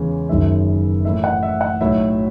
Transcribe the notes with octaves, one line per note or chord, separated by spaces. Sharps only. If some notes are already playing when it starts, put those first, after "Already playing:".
Already playing: E2 C#3 G#3 C#4
F#1 F#2 D#3 G#3 E5
A2 E3 A3 E5
F#5
E5
F#5
B1 A2 F#3 E5